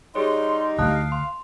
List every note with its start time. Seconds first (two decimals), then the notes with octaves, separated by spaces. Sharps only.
0.15 G3 D#4 G#4 C#5 C6
0.79 D2 F#3 A3 F5 A5 D#6 F#6
1.12 C6